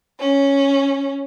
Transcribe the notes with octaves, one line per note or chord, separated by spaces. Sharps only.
C#4